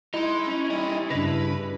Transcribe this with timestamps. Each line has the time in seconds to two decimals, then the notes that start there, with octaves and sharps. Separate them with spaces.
0.14 D#4 E4 D#5 C6
0.46 C#4
0.70 G3 D#5
1.10 G2 C#3 B4 A#6